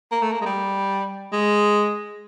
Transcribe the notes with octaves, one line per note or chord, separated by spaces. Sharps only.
A#3
A3
A#3
G#3
G3
G#3